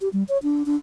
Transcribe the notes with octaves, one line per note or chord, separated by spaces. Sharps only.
G4
G3
C#5
D4
D4